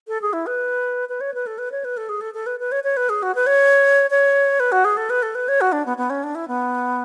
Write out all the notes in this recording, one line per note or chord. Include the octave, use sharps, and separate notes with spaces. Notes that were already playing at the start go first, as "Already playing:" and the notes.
A4
G#4
E4
B4
B4
C#5
B4
A4
B4
C#5
B4
A4
G#4
A4
A4
B4
B4
C#5
C#5
B4
G#4
F#4
B4
C#5
C#5
B4
F#4
G#4
A4
B4
A4
B4
C#5
F#4
D4
B3
B3
C#4
D4
E4
B3